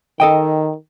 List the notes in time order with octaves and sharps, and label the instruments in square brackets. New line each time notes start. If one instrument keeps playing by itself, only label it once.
[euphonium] D#3 [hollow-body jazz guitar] A4 D#5 G5